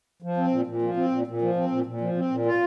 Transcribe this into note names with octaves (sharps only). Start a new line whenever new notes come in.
F3
C4
A#2
A#2
F3
C4
A#2
A#2
F3
C4
A#2
A#2
F3
C4
A#2
F4